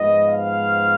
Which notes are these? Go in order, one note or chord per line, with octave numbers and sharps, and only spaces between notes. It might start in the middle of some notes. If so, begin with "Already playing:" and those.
Already playing: G#2 F3 B3 D#5
F5